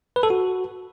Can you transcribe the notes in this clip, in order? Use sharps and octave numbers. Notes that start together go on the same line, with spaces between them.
B4
A4
F#4